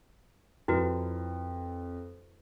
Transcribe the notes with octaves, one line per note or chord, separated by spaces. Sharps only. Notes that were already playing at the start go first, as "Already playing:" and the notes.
F2 E4 F#4 B4